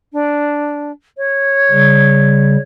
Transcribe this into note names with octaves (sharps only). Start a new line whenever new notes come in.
D4
C#5
C#3 G3